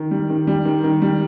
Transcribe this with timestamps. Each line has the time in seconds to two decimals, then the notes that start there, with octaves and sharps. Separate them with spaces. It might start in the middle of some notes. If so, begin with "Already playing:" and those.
Already playing: D#3
0.11 G3
0.30 D#3
0.47 G3
0.65 D#3
0.84 D#3
1.02 G3